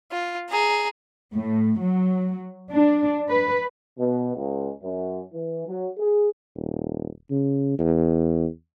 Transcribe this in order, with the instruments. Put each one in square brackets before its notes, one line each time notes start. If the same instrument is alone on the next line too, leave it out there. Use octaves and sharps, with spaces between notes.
[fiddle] F4
G#4 A#5
[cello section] A2
F#3
D4
B4
[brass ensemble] B2
C#2
F#2
E3
F#3
G#4
[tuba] D#1
C#3
E2